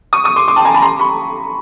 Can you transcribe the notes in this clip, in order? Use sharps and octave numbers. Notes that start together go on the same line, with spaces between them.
C#6 D#6
C#6 D#6
C6 D6
C6 D6
G5 A5
G#5 A#5
A5 B5
A#5 C6
B5 C#6